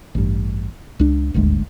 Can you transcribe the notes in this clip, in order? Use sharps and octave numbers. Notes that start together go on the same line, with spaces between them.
A1 G2
C#2 D4
D#1 G#1 D2 G#3